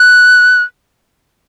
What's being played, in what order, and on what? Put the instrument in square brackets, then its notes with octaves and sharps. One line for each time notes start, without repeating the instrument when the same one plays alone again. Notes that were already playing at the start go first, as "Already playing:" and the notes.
Already playing: [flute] F#6